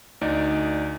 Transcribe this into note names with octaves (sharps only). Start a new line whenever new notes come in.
D2 D#4 D5